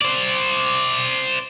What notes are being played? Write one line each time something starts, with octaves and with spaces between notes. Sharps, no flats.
C5 D5